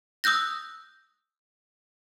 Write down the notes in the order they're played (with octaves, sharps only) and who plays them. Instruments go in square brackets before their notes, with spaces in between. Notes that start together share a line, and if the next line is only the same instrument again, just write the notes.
[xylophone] D#6 E6 F#6 G6 A#6